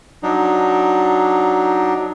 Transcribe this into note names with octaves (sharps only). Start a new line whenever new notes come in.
F#3 D4 D#4